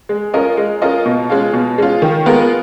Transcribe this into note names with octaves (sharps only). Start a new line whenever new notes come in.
G#3
C#4 F4 A#4 D#5
G#3
C#4 F4 A#4 D#5
B2
G#3 C#4 F4
B2
G#3 C#4 F4
D#3
G#3 B3 F4 A#4